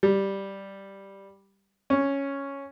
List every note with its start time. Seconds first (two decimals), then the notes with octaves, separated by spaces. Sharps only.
0.03 G3
1.90 C#4